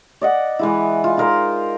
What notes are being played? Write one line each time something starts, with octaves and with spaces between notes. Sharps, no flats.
D5 D#5 F#5
E3 G#3 E4
F4
D#4 G#4 A#4 C5